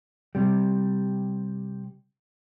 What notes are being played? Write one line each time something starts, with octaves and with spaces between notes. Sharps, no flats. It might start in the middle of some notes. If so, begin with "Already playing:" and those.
C3 G3